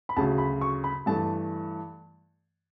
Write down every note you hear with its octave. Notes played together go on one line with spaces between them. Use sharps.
B5
D2 C#3 F#3 A5
B5
C#6
B5
G2 E3 A3 A5